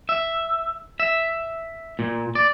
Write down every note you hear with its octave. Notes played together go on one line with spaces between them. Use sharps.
E5
E5
A#2
D5